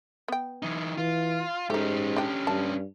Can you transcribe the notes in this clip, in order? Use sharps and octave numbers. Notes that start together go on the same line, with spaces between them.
B3 G5
E3 D#4
E3 F4
G#2 A3 C#4 D#4 G4
D4 G5
G2 A5